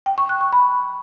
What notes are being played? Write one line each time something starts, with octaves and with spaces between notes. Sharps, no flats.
G5
C#6
F#6
C#6
B5